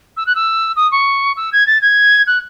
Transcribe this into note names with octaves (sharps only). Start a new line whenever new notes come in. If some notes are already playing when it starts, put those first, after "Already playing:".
E6
F#6
E6
D#6
C#6
E6
G#6
A6
G#6
F#6